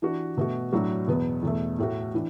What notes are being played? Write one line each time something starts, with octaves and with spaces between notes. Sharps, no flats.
E3 D4 F#4
B2 A3 F#4
A2 F#3 D4 F#4
E2 B2 B3
E2 B2 A3
A2 A3 F#4
E3 D4